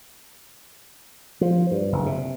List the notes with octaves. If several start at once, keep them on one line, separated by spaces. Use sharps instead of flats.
F3
G2
F#1
C3